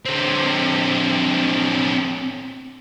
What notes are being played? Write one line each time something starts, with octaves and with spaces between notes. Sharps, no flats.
D3 C4